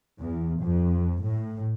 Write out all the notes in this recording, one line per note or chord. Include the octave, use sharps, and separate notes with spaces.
E2
F2
A2